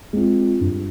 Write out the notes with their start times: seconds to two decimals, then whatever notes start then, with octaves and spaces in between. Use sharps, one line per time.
0.13 G#3 C4 F4
0.61 G2